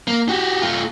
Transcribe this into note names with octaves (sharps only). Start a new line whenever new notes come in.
A#3
F#4 G4
A3 F4